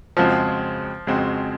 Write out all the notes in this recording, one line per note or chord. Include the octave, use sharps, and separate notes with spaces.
F2 C#3 F3 G#3 C4 F#4
F2 C#3 G#3 C4 F#4